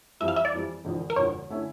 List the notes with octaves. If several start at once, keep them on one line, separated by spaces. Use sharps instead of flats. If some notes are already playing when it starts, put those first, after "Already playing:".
F2 E3 G3 E5
F5
E5
D5
F2 E3 G3
E1 E2 D3 F3
A#4
E1 E2 D3 F3 C#5
D3 A3 C#4 E4